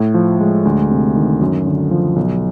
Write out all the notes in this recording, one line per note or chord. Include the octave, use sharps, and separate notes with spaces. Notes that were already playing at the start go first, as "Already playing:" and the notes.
Already playing: A2
F3
G#3
D2
C3
D#3
F#2
D3
F3
B1